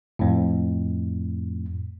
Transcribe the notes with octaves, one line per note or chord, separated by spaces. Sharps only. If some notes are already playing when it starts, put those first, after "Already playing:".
F2 A2